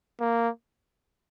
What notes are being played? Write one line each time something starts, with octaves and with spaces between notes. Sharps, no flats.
A#3